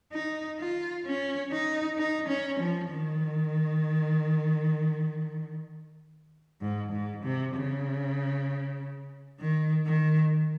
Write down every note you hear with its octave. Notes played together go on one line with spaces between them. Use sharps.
D#4
F4
C#4
D#4
D#4
C#4
F3
D#3
G#2
G#2
C3
C#3
D#3
D#3